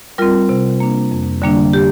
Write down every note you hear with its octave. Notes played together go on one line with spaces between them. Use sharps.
G3 C4 F4 A#4
C3
A#3 D4
F2
D3 G3 A#3 D4
G4